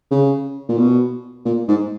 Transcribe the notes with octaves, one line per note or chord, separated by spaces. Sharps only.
C#3
A#2
B2
A#2
G#2